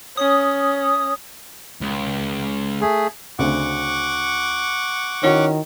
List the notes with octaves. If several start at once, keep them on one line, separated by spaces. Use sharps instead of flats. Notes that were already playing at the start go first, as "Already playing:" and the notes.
C#4 D#6
C#2
A3 G#4
D2 C#3 C4 F#5 C#6 D6
D#3 C#4 E4 F#4 C#5